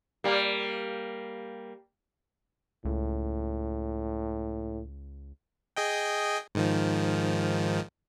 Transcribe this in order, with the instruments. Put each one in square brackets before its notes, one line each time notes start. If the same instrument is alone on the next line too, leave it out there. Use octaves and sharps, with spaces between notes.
[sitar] G3 A#3
[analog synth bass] C#2 [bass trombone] A2
[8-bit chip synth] G#4 D#5 G5
G#2 D#3 F3